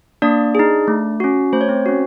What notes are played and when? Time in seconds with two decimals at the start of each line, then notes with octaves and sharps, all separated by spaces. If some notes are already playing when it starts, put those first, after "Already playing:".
0.22 A#3 D4 D5
0.55 D#4 G#4
0.88 A3
1.20 C#4 F#4
1.53 A3 C5
1.61 C#5
1.69 C4 C5
1.86 C#4 F#4